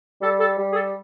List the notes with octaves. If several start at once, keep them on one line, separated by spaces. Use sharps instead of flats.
G3 A4
A4
G3
G#4
A4